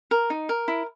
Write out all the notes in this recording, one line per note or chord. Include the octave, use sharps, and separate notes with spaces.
A#4
D#4
A#4
E4